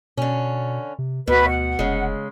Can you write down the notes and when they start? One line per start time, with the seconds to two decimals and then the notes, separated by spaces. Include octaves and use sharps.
0.17 B2 D3 C#4
0.99 C3
1.27 D2 B2 F#4 B4
1.48 F#5
1.79 F1 C#3 G#3